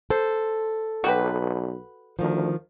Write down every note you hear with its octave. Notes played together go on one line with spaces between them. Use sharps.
A4 C5
B1 F#4 G4 B4
D2 D#3 F3